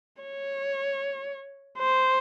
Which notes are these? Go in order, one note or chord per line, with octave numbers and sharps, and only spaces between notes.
C#5
C5